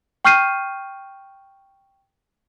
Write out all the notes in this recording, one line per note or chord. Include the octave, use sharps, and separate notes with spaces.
G5 C#6 F6 G6 C7 D#7